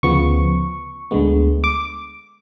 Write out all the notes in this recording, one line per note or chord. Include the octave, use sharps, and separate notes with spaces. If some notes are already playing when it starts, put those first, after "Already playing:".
D2 C#3 F3 B3 C#6
D2 D3 G#3 B3
D6